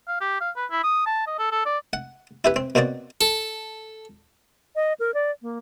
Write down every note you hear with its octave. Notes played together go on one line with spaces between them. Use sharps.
F5
G4
F5
B4
E4
D#6
A5
D#5
A4
A4
D5
F#5
E4 G4 B4
C4
B2 A#3 C4 F#4 D5
A4
D#5
A#4
D5
A#3